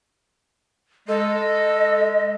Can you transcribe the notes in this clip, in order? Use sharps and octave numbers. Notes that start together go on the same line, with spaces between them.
G#3 A4 D#5